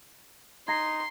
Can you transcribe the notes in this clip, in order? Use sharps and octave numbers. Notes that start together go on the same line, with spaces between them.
D#4 A#5 C6 G#6 A#6 C7